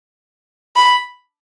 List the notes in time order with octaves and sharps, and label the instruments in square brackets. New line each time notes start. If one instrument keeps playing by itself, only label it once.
[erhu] B5